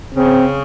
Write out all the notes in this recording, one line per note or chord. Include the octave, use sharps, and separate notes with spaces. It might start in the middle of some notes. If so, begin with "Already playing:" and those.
C#3 C4